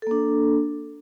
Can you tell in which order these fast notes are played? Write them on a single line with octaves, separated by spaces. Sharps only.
A4 A#3 D4